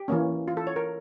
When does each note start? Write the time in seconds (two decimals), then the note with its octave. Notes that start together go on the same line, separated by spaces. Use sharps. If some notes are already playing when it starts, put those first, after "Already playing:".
Already playing: G4
0.08 E3 A#3 C#4
0.48 F4
0.57 A4
0.67 C#5
0.76 A#4